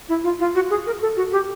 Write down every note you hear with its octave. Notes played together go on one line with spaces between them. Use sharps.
E4
F4
F4
F#4
G#4
A#4
A4
F#4
G4